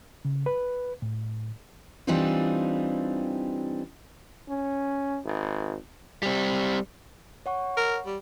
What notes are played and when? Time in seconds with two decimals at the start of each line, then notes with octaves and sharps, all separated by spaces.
0.25 C#3
0.46 B4
1.02 A2
2.07 E3 G3 C4 D4 D#4 F4
4.48 C#4
5.24 G#1
6.23 G3 C4
7.46 C#5 F#5 C#6
7.77 A#4
8.06 G3